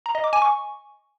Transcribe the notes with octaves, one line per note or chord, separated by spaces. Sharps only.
A#5
D#5
D6
G#5
C#6